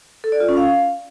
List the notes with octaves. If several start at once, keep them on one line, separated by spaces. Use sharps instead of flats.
A4
D5
F4
C#4
F5